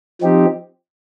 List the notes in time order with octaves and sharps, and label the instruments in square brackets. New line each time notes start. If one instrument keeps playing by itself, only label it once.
[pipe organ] F3 C4 D#4 G4